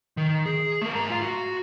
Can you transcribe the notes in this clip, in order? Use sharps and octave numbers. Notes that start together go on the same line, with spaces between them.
D#3
G#4
A3 A#4
G#2 A#5
F4 F5
F#4